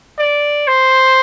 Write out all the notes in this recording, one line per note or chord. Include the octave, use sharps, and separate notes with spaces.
D5
C5